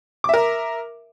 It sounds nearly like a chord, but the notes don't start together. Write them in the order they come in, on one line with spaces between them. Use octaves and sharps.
D6 E5 A#4